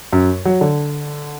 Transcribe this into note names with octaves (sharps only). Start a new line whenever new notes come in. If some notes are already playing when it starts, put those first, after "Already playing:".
F#2
F#3
D3